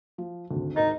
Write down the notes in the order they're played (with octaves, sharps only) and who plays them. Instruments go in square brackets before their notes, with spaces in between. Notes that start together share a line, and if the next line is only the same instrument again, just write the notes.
[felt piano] F3
G#1 D2
[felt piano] G#2 A#4 A6 [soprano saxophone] D#4